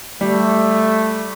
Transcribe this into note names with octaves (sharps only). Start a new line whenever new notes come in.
G3 A3